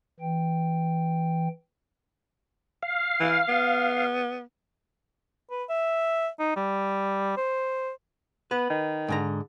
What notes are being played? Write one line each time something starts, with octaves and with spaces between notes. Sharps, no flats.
E3 G5
F5
E3
B3
B4
E5
D#4
G3
C5
B3 B4
D#3
G#2 D3 A#5